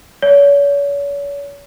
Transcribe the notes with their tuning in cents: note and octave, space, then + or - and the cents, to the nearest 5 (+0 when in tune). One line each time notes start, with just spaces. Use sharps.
C#5 +40